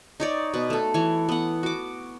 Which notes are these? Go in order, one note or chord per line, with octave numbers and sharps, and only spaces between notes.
D#4 C#5 D5
B2 B4
A3 A4
E3 C#5
B3 F#5
F#4 D6